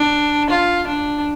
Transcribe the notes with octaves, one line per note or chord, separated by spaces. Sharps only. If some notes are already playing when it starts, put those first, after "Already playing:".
Already playing: D4
F4
D4